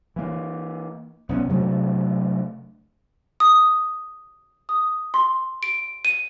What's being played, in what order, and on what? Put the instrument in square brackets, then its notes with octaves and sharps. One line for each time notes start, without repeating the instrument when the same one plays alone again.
[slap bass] E3 A#3
B1 B3 C#4
C3 F#3 A3 D4
[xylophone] D#6
D#6
C6
D7
D#7